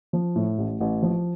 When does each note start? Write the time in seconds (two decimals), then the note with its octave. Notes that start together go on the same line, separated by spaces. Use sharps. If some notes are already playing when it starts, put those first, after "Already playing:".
0.13 F3
0.36 A2
0.58 A1
0.80 A1
1.02 F3